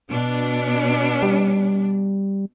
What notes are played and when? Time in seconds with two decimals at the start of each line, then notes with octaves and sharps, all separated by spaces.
0.11 B2 D4
1.23 G3